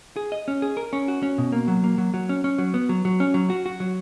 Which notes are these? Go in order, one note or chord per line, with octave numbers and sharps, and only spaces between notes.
G#4
D#5
C#4
G#4
A#4
C#4
F#4
C#4
B2
A#3
F#3
A#3
F#3
F#3
C#4
C#4
F#3
B3
F#3
F#3
C#4
F#3
F#4
F#4
F#3